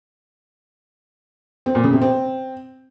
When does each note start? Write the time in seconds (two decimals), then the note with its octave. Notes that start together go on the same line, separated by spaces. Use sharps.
1.66 C4
1.75 A#2
1.84 C#3
1.93 C3
2.01 C4